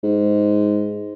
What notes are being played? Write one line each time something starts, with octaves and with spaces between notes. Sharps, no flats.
G#2